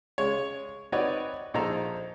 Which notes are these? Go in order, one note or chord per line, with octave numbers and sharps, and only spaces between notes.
C#3 G#3 C#5
C4 D#4 F#4 B4 C#5 D5
A#1 D#4 A4 C5 A#5